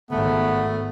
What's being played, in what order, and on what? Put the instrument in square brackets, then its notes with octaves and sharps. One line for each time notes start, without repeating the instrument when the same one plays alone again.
[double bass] G#1 [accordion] A3 [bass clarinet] B3